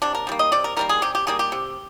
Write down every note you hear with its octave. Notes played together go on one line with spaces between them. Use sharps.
C3 D4
A#4
D#3 G3 A#3
D#5
C3 D5
A#4
D#3 G3 A#3 A#4
G#4
C3 G4
G4
D#3 G3 A#3 G#4
G4
C3